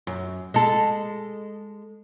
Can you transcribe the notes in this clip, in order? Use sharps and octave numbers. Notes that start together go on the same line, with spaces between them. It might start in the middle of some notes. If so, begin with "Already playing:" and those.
F#2
G#3 A4